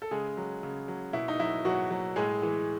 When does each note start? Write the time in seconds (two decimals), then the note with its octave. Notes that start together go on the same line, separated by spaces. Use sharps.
0.02 A4
0.11 C#3 G#3 G#4
0.37 F#3
0.63 C#3
0.88 F#3
1.13 B2 E4
1.28 D#4
1.40 F#3 E4
1.65 B2 F#3 F#4
1.91 F#3
2.16 A2 G#3 G#4
2.42 E3 G#3